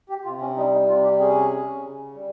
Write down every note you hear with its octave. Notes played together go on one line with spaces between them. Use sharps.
G4
C3 F4
C#4
G3 D#4
D#4
C3 F4
G4
C#4 G#4
C#4
C#3
G3